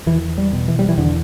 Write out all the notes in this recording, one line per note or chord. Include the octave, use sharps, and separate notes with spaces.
E2 E3
G3
B2
E3
G3
E3
E2 D3